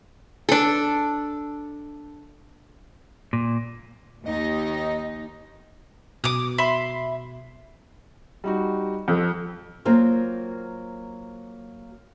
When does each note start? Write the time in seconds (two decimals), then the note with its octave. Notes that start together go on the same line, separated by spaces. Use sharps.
0.49 D4 A4
3.33 A#2
4.26 D#2 D#4 D#5
6.24 B2 D6 D#6
6.58 E5 B5 C6
8.44 G3 D#4 F#4
9.08 F2 C4 A4
9.85 F#3 A#3 C4 F4 A#4